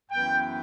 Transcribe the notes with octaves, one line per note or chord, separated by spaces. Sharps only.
F#2 E3 B3 G5